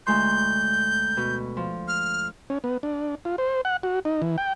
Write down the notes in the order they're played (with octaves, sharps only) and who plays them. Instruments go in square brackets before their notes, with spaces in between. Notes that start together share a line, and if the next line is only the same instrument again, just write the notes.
[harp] D2 G#3 C6 [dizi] G6
[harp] B2
F3
[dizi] F6
[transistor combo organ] C#4
B3
D4
F4
C5
F#5
F#4
D#4
E3
G5